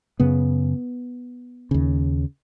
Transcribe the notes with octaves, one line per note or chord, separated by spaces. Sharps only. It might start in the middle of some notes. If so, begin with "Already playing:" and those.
F#2 C#3 B3
D#2 C#3